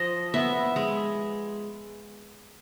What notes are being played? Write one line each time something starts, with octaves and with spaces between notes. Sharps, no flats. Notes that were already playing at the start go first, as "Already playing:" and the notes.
Already playing: F3 D#5
B3 E5
G#3